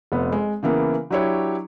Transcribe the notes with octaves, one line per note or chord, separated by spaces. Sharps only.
F1 B3
G#3
C#3 E3 A#3 B3
F#3 D4 E4 G4 C#5